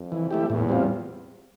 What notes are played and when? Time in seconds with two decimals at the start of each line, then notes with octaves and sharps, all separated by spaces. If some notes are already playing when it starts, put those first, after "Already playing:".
Already playing: F2
0.12 E3
0.31 A3 E4 G4
0.50 E2 A2
0.69 G3 C4 F4